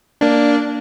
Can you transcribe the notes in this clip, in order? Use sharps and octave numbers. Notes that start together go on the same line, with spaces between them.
A#3 D4